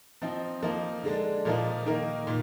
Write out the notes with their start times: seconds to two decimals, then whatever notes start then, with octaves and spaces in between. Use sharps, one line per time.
0.22 F3 C4 D#4
0.62 F3 A#3 D#4
1.03 D3 G#3 D4
1.45 A#2 F3 A#3 D#4
1.86 D#3 A#3 D#4
2.27 A#2